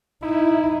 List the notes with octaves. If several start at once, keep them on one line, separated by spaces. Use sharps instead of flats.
D#4 E4